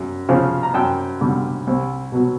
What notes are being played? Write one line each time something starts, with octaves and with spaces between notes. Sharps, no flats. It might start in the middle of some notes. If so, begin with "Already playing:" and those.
Already playing: F#2
C#3 F3
A#5
F#2 G5 A5
D3 G3
C2
B2 F#3